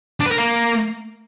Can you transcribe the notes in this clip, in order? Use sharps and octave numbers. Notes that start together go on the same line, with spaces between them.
D4
B4
A#4
A#3